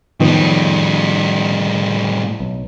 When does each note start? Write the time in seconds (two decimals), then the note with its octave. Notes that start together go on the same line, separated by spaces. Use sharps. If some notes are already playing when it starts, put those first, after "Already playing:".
0.20 A2 D#3 F3 G3 B3
2.40 B1